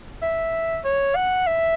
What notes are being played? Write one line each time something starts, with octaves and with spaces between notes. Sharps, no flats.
E5
C#5
F#5
E5